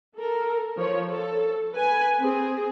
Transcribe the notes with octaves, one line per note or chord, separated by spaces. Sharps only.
A4 A#4
F3 C#5
A4
B4 G#5
C4 G#4